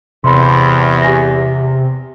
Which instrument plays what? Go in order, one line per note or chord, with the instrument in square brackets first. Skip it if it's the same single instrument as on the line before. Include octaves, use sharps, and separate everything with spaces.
[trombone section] E2 [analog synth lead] C3 [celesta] B5 C6
[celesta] G4 G#5 A#6